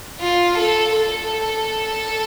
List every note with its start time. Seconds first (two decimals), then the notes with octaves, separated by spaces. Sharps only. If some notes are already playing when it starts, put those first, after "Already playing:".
0.20 F4
0.58 A4
0.96 A4